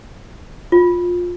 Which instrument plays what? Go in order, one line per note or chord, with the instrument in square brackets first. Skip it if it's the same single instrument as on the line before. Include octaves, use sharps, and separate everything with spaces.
[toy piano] F4